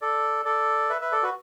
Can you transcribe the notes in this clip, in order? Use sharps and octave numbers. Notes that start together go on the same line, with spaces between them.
A4 D5
A4 D5
B4 E5
B4 E5
A4 D5
F#4 B4